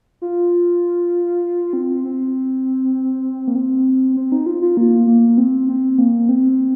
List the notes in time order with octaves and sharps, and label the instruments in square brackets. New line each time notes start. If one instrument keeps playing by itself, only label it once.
[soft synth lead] F4
C4
C4
A#3
C4
C4
D#4
F4
F4
A#3
A#3
C4
C4
A#3
C4